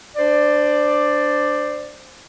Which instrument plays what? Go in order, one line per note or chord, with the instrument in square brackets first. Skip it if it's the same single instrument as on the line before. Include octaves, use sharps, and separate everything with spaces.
[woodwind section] D4 C5 D5